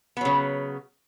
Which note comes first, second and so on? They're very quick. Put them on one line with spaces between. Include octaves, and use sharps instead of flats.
B3 F#3 C#3